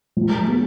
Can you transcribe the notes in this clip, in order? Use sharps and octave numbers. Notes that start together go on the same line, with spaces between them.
F3
G#3 B3